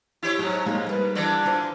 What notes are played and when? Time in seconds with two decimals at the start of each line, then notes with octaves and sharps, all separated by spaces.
0.23 E4 G4 C#5
0.39 G#2 F#3 G#4
0.66 G#3 A#3 D#4 A4
0.87 G3 A#3 B4
1.15 D3 E3 D4 D5
1.45 F4 A#4 C5